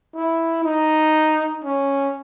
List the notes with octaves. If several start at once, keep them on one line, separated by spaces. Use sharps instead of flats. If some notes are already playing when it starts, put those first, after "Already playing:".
E4
D#4
C#4